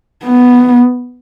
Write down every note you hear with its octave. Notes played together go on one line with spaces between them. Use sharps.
B3